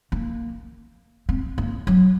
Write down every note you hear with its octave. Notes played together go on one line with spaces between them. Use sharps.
A#3
C4
A#3
F#3